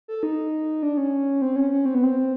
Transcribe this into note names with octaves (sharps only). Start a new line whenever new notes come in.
A4
D#4
D4
C#4
C4
C#4
C#4
C4
B3
C4